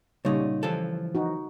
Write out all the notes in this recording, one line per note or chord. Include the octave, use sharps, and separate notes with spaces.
A#2 C#3 G3 D#4 C#5
E3 F3 A4
D#4 F#4